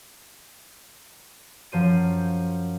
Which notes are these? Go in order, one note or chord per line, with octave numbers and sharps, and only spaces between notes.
F#2 F3 C5 D#7